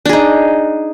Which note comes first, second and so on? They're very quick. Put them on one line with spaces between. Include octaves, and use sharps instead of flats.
D4 G#4 D#4